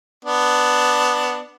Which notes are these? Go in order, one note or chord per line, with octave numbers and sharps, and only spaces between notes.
B3 D4